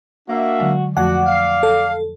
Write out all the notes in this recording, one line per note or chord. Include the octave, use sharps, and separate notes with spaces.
A#3 D4 F#4 E5
D3 F#3 G#3
F2 F3 A3 F#4 D5 F#5
F5
A4